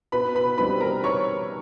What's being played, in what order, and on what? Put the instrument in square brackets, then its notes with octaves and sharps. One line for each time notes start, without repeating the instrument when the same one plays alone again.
[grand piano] B2 [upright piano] B4 B5
[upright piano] B4 B5
[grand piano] G3 C4 D#4 [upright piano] B4 B5
[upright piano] A#4 A#5
C#5 C#6